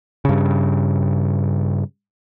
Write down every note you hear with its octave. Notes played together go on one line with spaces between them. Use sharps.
G2 C#3